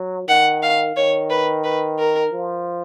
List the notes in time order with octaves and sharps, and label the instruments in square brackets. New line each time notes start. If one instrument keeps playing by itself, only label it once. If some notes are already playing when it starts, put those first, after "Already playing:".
Already playing: [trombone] F#3
[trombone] D#3 [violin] F#5
[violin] F5
[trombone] D#3 [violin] C#5
[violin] B4
B4
A#4
[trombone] F3